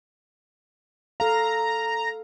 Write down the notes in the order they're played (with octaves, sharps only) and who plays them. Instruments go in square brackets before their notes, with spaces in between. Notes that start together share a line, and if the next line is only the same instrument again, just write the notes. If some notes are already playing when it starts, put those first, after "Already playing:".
[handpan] A4 F5 [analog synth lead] A#5